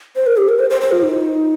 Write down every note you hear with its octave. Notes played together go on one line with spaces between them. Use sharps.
C5
A#4
G4
A#4
C5
C5
C5
F4
D#4